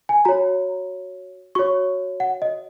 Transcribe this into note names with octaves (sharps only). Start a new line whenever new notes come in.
G#5
F#4 C#5 A#5
F#4 C#5 C#6
F#5
D#5